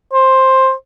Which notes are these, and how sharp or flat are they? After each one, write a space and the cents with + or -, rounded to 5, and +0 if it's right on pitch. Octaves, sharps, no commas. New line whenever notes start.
C5 +10